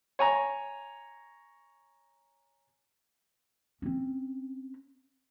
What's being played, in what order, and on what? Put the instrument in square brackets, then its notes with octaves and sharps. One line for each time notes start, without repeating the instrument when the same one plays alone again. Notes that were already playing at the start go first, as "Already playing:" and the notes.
[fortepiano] C#5 G#5 A#5
[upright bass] C4 C#4